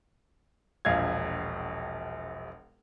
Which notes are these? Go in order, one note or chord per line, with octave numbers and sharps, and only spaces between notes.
E1 A#1 F5 G#6